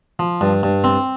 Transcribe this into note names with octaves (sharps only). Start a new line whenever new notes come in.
F3
G2
G2
C4